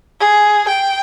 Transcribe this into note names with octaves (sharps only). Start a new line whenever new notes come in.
G#4
G5